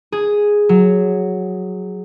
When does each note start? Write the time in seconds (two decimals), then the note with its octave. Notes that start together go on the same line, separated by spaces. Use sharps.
0.12 G#4
0.69 F#3